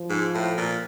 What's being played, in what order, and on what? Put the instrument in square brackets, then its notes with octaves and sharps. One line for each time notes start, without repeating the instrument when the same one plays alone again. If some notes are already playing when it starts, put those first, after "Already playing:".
Already playing: [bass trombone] F3
[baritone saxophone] G#2
A2
A#2